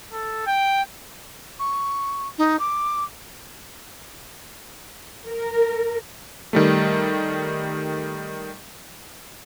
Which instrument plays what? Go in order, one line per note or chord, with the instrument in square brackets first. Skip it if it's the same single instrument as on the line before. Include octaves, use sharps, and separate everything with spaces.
[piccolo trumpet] A4
G5
[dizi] C#6
D#4
D6
[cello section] A#4
[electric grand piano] D#3 G3 A3